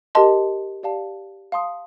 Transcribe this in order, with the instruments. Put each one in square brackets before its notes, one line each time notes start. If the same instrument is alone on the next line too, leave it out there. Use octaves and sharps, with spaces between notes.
[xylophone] G4 A#4 D#5 A5 C6
G4 D5 F5 A5
F5 A5 C6 D#6